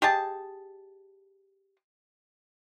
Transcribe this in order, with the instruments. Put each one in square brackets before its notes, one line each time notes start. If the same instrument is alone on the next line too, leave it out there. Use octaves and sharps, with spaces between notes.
[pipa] G4 G#4 D#5 A5